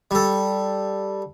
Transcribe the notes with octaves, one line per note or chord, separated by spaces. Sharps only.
G3 A4